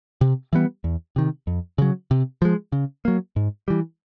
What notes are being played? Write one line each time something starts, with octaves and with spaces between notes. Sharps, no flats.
C3
E3 G3 B3
E2
C3 D#3
F2
C#3 F#3
C3
F3 G#3
C#3
F#3 A#3
G#2
E3 G3